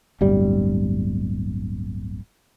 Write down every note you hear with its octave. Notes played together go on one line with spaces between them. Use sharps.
D1 G1 G3